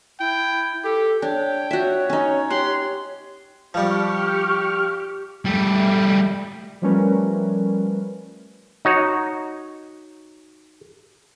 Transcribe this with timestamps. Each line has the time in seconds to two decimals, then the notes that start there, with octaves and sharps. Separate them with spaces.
0.20 E4 G5
0.84 G4 A4
1.22 D4 C#5 G5
1.71 F#4 C#5 E5
2.10 C#4 D#4
2.50 G4 F#5 C6
3.74 F3 G3 G4 C#6 F6
5.45 G3 A3
6.82 F3 G3 A3 C#4 A#4 B4
8.85 D#4 F#4 C#5